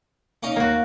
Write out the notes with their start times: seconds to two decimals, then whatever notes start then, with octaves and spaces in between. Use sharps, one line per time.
0.43 A#3 C#4 D#4
0.56 D#2 A#3 F#4